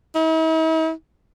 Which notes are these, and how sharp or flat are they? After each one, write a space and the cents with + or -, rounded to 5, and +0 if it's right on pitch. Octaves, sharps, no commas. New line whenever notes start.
E4 -45